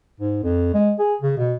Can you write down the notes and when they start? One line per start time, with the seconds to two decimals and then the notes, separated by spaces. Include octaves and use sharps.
0.20 G#2
0.44 F2
0.74 G#3
0.99 G#4
1.22 C#3
1.38 B2